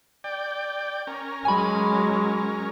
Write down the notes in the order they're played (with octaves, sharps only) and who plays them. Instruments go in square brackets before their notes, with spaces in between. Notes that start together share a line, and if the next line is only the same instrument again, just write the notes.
[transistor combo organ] D5 G5
C#4 A#4
[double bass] F#3 G#3 [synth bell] G#5 B5